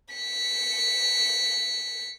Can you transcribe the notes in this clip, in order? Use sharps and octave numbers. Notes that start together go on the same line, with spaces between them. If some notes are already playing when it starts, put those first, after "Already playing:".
B6 C#7